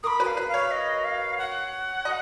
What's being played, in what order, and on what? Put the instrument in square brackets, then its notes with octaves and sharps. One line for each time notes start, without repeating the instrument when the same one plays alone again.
[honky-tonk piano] A#4 [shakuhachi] B5 D#6
[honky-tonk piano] B4
[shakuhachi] F5
[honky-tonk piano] B4
[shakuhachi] F5
[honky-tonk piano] C#5
[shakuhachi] D#5
F5
F#5
[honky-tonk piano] D#5